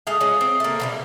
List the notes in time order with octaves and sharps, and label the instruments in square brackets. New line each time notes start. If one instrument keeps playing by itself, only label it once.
[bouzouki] G#3 A3 F5 [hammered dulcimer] G#4
[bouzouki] G#3 C#4 F4
C4
A3 A#3
B2 F3 G3